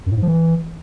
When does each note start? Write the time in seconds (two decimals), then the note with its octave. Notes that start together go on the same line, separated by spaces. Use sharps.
0.06 F#2
0.12 A2
0.17 G#2
0.22 F3
0.28 E3